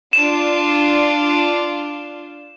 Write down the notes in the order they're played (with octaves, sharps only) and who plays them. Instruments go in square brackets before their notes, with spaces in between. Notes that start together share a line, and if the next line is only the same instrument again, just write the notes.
[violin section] D4 F4 [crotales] E7